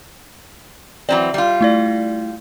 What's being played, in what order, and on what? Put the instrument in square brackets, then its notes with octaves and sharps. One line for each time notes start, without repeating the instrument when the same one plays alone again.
[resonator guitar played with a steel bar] E3 F#3 C4 [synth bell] D5
[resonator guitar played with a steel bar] G3 F4
[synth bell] A3 E4 D5